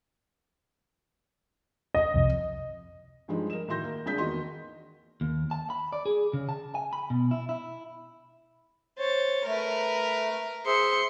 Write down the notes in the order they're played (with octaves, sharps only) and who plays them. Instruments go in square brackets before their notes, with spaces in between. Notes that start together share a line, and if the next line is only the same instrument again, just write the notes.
[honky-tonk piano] D#5
[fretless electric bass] C2 F2 C3
[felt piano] G2 F3 G3 G#3 D#4
A#4 D#5 E7
A2 D#3 F#4 C6 G6 A#6
A#3 A#4
G#1 D4 G#4 G6 B6
E2 D#3 A#3 F#4 D#5 C6
[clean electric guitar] D#2
A5
B5
D5
G#4
C#3
A5
G#5
B5
B2
E4
E4
[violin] C5 A6 [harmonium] C#5
[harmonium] A3 [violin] A#4 B4
[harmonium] G#4 C5 E5 [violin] C6 C#7